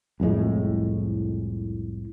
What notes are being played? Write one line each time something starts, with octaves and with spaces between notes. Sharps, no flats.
C2 F2 A2 G#3